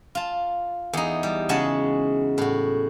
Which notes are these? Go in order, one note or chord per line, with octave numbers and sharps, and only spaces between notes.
F4 A5
E2 D#4
G3
C#3 G#3 F#4 F#5 G#5 A5
A2 F#4